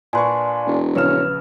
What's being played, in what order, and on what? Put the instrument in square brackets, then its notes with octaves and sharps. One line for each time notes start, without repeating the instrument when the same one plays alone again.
[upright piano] A#2 B4 C#6 [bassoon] D4 [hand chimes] G#5 C6
[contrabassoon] E1
[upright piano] A#1 C#3 E7 [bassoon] C#4 [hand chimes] B4 F6